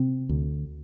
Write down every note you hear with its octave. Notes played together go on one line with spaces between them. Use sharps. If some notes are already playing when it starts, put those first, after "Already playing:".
Already playing: C3 C4
D2